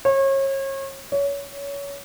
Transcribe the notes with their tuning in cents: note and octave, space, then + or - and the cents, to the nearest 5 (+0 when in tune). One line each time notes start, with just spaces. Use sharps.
C#5 -35
C#5 +25